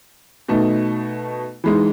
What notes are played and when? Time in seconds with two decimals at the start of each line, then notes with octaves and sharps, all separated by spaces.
0.48 B2 A3 D#4
1.64 E3 G#3 D#4